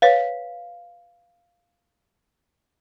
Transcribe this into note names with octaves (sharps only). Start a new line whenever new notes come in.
B4 C#5 F5